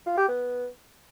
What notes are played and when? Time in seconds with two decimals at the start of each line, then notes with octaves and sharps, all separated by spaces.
0.06 F4
0.17 G4
0.28 B3